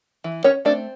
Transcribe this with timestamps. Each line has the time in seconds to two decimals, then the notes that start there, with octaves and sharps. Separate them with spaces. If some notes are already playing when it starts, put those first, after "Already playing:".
0.24 E3
0.44 C#4 C#5
0.65 A3 C4 D4 D5